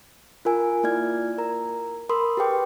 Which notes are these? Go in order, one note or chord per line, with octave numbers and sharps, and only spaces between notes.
F4 A#4 G#5
A#3 E4 F4 D5 F6 G#6
A#4 A#5
A#4 B5 C6 D#6
G4 G#4 B4 G5 D6